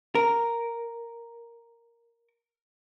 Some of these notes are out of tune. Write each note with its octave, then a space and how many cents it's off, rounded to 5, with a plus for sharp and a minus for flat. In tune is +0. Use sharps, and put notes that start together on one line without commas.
A#4 +0